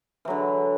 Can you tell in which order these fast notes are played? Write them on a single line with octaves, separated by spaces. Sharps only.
E3 F#3 D3